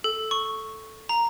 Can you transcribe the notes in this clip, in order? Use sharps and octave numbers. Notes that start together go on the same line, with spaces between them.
A4
C#6
A#5